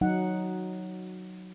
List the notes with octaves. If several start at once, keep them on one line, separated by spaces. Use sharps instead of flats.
F#3 D#4 F#5